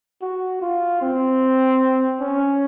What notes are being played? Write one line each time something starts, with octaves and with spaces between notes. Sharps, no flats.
F#4
F4
C4
C#4